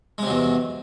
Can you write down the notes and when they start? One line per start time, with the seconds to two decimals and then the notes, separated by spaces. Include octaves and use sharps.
0.18 G#3
0.22 C3
0.26 F#3
0.30 E2